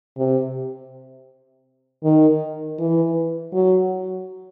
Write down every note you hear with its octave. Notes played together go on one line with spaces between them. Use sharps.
C3
D#3
E3
F#3